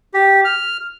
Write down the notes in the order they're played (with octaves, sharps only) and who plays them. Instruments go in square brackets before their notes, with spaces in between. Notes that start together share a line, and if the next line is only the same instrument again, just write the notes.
[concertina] G4
F6